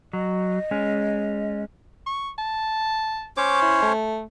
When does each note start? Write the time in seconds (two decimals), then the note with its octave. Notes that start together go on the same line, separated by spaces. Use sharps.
0.13 F#3 D#5
0.71 G#3 C#4
2.06 C#6
2.38 A5
3.37 C#4 C5 C#5 D6
3.62 E4
3.82 A3